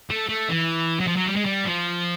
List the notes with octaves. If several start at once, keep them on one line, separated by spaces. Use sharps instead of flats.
A3
A3
E3
F#3
F3
F#3
G3
G#3
G3
F3